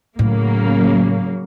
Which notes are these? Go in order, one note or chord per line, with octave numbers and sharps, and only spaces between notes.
A2 C#3 F#3 A#3